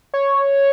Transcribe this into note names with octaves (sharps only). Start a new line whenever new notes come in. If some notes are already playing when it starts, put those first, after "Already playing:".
C#5